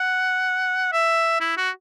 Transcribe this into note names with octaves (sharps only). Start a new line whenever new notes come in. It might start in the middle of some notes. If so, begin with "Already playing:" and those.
Already playing: F#5
E5
E4
F#4